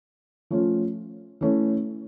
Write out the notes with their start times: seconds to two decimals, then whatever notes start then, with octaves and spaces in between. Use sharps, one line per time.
0.50 F3 A3 C#4 F4
1.41 E3 A3 C#4